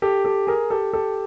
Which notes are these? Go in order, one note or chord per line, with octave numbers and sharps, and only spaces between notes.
G4 A4
G4 A4
G#4 A#4
G4 A4
G4 A4